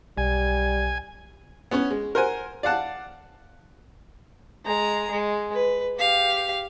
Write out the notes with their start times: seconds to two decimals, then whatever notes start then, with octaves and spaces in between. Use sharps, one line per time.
0.18 B1 G3 G#5
1.71 B3 C#4 C#5
1.91 G#3
2.15 A#4 C5 F#5 G#5
2.63 D5 F5 F#5 A5
4.65 G#3 A#5
5.10 G#3
5.53 B4
5.98 G4 F5